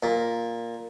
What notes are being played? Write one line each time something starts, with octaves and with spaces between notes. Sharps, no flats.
A#2